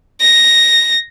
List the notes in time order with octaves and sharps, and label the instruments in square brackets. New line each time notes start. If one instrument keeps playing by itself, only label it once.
[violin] A#6